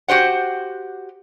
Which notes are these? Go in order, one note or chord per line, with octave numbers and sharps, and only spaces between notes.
F#4 G4 C5 F#5